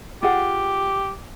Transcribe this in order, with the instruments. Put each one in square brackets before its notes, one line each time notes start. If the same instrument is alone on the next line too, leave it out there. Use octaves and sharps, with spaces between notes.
[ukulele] F4 G#4 F#5 [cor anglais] G4